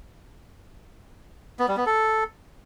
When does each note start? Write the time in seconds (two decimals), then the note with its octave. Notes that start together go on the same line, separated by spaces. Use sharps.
1.59 B3
1.68 G3
1.77 B3
1.86 A4